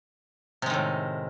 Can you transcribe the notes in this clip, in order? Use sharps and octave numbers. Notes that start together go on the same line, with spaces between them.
A2 C3 D#3 G#3